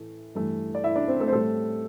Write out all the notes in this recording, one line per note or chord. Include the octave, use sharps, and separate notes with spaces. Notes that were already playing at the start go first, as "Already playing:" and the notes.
Already playing: A2 E3 A3
G2 E3 A3
D5
E4 E5
D4 D5
C4 C5
A3 A4
C5
A2 G3 A3 A4